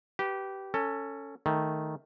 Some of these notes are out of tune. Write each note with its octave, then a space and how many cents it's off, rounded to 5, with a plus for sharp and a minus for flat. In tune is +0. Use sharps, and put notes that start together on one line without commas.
G4 -15 B4 +0
C#4 +0 A4 +20
D#3 +0 A3 +0